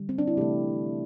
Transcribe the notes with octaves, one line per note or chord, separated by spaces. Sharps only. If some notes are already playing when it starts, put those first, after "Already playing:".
Already playing: D3 G3
C4
D4
E4
C3 E3 A3 G4